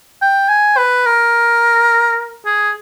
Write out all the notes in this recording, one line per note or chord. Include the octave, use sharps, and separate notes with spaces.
G5
G#5
B4
A#4
G#4